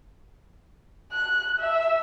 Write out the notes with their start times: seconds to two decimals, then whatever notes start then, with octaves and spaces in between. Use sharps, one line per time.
1.13 F#6
1.60 E5